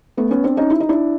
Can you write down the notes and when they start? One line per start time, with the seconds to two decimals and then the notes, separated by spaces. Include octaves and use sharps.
0.17 A3 B3
0.31 B3 C#4
0.44 C4 D4
0.57 C#4 D#4
0.70 E4
0.80 D#4
0.89 D4 E4